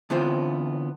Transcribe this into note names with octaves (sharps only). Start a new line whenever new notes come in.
D3 E3 B3 C4 F4 C5